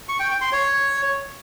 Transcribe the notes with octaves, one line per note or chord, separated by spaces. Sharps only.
C#6
G5
G5
C6
C#5